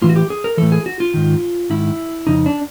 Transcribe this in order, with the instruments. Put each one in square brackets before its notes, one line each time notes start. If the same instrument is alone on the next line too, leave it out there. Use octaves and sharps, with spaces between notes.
[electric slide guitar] A2 E3 F4
F#4
G4
G#4
A#4
A2 E3 A4
G#4
F#4
F4
G#2 D#3
G#2 D#3 E4
F2 C#3 D#4
D4